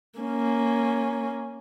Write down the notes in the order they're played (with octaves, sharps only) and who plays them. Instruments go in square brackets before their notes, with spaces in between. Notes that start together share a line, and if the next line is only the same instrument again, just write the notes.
[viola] A#3 C#4